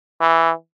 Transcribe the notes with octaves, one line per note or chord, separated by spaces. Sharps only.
E3